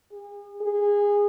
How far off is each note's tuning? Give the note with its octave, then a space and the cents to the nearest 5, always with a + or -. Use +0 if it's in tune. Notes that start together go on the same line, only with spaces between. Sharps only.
G#4 -40
G#4 -20